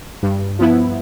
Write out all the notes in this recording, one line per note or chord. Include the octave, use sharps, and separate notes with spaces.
G2
F3 B3 E4